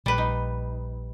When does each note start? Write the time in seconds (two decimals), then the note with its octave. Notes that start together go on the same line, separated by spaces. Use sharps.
0.06 A#1 G3 B4
0.18 D#4